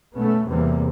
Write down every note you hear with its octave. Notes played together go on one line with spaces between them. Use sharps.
B2 A3 B3 C#4
E2 C3 E3 G3 A#3